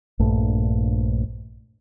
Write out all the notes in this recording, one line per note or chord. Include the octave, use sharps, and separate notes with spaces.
A#1 G2 A3